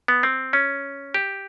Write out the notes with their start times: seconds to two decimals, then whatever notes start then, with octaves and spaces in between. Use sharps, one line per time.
0.08 B3
0.23 C4
0.53 C#4
1.14 G4